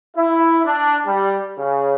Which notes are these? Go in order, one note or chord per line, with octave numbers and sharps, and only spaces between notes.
E4
D4
G3
C#3